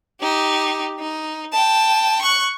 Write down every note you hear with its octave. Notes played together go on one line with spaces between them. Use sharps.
D#4 G4
D#4
G5 A5
C#6 F#6